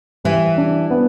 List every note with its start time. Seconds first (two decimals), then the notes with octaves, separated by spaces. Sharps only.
0.24 E3 G3
0.57 D4
0.90 B3